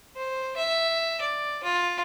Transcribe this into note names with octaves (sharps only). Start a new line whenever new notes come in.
C5
E5
D5
F4